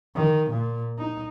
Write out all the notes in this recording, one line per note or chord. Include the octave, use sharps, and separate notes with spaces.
D#3
A#2
D#4